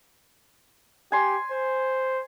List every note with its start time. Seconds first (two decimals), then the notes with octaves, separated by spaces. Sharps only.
1.12 G4 G#5 C6
1.52 C5